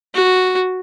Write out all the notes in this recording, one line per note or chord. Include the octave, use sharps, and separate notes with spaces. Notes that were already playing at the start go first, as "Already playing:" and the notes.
F#4